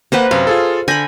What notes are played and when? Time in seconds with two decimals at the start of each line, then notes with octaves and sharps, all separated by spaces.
0.12 A#3 B4 C5 F#5 A#5
0.31 F#2 C3 F5
0.47 F4 G#4 A4
0.88 D3 G#5 B5 G6 A#6